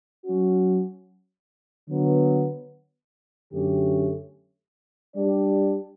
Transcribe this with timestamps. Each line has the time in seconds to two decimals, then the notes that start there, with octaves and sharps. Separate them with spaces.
0.25 F#3 C#4 F#4
1.89 D3 F#3 B3
3.52 F#2 D3 A3 C#4 G4
5.16 G3 D4 G4 D5